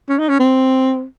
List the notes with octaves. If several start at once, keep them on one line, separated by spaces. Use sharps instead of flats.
C#4
D#4
C#4
C4